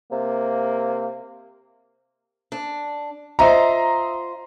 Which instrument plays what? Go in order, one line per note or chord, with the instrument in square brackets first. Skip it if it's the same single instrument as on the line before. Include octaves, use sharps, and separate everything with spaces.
[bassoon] C3 [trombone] A#3
[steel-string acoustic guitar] D4
[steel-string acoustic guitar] F4 C5 [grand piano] D#5 E5 A#5